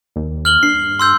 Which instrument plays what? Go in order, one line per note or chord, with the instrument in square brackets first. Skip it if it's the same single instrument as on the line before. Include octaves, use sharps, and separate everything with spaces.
[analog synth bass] D#2
[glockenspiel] F6 F#7 G7
[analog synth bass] G2 [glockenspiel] C7
[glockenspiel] C6 E6 G6